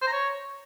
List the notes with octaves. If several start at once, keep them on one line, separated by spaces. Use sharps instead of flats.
C5
A#5
C#5